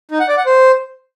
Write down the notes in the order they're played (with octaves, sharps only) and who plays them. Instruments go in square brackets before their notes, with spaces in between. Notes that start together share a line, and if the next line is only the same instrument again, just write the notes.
[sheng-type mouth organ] D#4
F#5
D5
F#5
C5